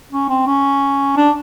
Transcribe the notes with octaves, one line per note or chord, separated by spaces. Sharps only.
C#4
C4
C#4
D4